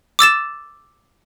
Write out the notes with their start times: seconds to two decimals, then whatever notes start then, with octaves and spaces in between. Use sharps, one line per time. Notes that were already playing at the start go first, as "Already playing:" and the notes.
0.19 D6 E6 A6 E7